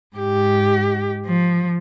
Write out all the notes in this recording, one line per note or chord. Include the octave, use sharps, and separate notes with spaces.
G#2 G4
F3